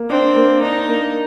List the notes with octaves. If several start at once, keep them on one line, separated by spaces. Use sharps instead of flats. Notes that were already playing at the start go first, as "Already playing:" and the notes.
Already playing: A#3
C4 D4
A#3
D4 D#4
A#3